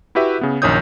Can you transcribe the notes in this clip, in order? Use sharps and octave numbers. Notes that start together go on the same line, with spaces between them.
E4 F#4 G4 B4 E5
C#3 B3
A#1 F#2 D#3 C#5 D#6 G6